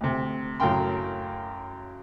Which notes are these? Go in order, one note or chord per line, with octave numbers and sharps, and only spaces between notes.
D2 C3
F#2 A2 C#3 A#4 G5 C6